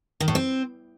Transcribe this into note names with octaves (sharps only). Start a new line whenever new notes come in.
D#3
A2
C4